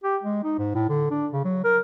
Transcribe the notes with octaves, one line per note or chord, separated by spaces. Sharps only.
G4
G#3
D#4
G#2
A2
D3
D4
C#3
F#3
A#4